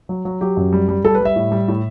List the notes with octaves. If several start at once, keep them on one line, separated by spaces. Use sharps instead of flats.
F#3
F#3
F#3 G4
F#2
G3
G3
G3 A4
B4
G3 E5
A2
G3
A2